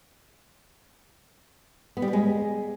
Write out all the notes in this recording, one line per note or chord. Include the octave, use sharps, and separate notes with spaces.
B3
G3
B3
G#3